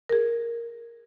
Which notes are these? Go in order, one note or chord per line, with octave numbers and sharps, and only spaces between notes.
G#4 A#4